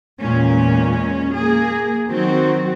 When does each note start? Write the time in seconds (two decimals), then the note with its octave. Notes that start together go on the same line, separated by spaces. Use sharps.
0.20 E2 A#2 G#3 C#4
1.35 A#3 G#4
2.09 D#3 F#3 C4 F#4